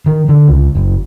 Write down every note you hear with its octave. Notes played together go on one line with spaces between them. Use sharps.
D#3
D3
C#2
F#1